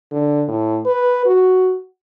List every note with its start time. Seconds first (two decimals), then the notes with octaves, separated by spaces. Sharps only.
0.11 D3
0.48 A2
0.85 B4
1.26 F#4